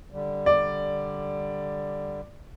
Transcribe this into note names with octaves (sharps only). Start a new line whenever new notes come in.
D3 G3
D5